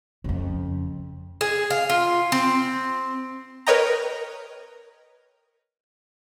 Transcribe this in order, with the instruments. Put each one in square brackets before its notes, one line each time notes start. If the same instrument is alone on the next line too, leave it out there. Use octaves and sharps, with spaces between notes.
[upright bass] F2 C#3
[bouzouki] G#4
F5
F4
C4
[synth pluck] A#4 B4 C#5 D#5 G5 A#5